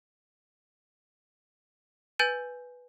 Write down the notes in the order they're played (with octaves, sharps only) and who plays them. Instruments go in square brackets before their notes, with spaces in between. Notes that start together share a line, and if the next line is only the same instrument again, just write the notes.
[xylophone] B4 G#5 G6 A6 D#7